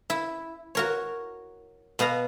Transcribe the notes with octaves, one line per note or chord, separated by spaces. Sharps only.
E4
F#4 A#4 C#5
B2 B3 F5 A#5